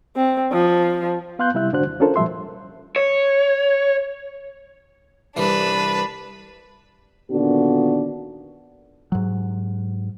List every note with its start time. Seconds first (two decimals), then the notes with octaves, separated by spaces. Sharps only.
0.16 C4
0.52 F3
1.39 B3 F5 C6 F#6 G6
1.54 C3 G3 E4 E5 F#6
1.72 G#2 D3 D4 F#4 C5 F#6
1.87 D#2
2.00 C#4 D4 F4 A4 A#4 C5
2.16 A#2 F3 G3 E5 C6
2.96 C#5
5.37 C2 E3 D4 B4
7.31 A#2 D3 D#3 B3 D4 F#4
9.12 G#2 F#3